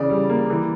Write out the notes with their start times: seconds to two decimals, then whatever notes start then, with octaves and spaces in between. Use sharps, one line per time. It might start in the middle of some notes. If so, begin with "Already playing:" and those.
Already playing: C#3 E3 D5
0.10 G3
0.30 A#3
0.50 E3